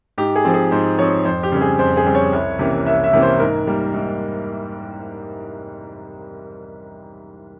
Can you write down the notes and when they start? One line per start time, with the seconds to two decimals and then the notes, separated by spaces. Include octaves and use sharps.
0.18 G#2 G4
0.36 G#4
0.45 F3 C4
0.54 G#4
0.71 G#2 C5
0.99 F3 C4 C#5
1.25 F2 C5
1.43 G4
1.52 C#3 G3 C4
1.61 G#4
1.79 F2 C5
1.97 G#4
2.06 C#3 G3 C4
2.15 C#5
2.33 C2
2.59 C3 E3 A#3 C#4
2.86 C2 E5
3.04 E5
3.13 C3 E3 A#3 C#4
3.22 C5
3.40 G#2 A#4
3.67 G3 A#3
3.94 G#2